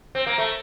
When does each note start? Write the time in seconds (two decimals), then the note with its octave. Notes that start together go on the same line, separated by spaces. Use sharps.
0.15 C4
0.26 A#3
0.38 A3